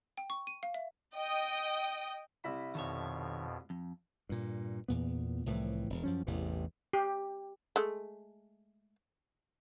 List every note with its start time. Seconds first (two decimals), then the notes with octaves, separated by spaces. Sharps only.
0.18 G5
0.30 C#6
0.47 D#7
0.63 F5
0.74 E5
1.16 D#5 G5
2.44 C2 E4 B5
2.75 F2 B2 D#3 A4 C#5
3.70 F2
4.29 G2 A#2
4.88 E2 A#2 B3
5.46 C2 A2 E3 F3
5.90 E1
6.03 F#2 F3 C#4
6.27 A1 E2 C3 E3
6.93 G4
7.76 G#3 A3